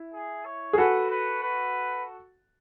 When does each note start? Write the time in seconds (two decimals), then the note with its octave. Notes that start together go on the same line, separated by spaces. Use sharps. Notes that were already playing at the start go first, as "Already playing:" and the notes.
Already playing: E4
0.13 G#4
0.45 C#5
0.73 G#4
0.78 F#4 A4 B4
1.10 B4
1.42 B4